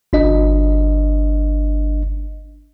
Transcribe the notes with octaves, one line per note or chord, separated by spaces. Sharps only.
G1 D4 D#5